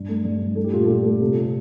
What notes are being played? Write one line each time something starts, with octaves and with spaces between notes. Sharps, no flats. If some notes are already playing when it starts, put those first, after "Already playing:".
Already playing: G2
A3
G2
G2
A3 A4
G4
A#2 F4
A4
A#2 G4
A3 A4
C3
C3